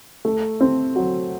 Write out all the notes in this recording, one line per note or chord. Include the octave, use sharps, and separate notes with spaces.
A3
C4
F#3